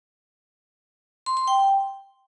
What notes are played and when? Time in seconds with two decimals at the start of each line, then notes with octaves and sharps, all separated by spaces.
1.26 C6
1.37 C6
1.47 G5